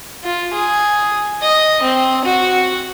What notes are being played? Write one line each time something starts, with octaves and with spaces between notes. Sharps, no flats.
F4
G#4
D#5
C4
F#4